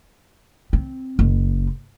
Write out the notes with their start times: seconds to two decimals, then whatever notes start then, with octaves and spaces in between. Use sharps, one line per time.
0.73 C4
1.19 F#1